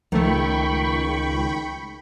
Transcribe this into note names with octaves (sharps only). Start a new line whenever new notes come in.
C#2 D#3 F3 A3 G5 B5 C#6